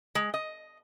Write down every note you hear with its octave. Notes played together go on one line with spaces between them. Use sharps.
G#3
D#5